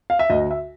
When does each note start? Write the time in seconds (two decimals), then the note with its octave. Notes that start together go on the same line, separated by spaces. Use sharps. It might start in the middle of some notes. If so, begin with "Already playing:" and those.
0.10 F5
0.19 E5
0.30 D2 D#5
0.51 E5